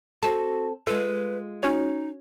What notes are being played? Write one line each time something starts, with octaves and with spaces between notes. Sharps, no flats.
C4 F#4 A4 A5
G#3 F4 A4 B4
C#4 D#4 F#4 C#5